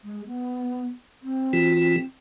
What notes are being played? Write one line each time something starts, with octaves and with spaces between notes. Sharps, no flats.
G#3
B3
C4
E3 F4 F#4